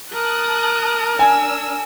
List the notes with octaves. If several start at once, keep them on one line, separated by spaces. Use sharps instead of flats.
A#4 A5 D#6 F#6
D4 G#5 E6